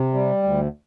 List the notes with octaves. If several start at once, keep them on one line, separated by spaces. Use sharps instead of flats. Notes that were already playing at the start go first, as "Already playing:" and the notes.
Already playing: C3
G3
D2